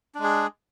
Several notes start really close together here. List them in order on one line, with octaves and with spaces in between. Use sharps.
D4 G#3 G#4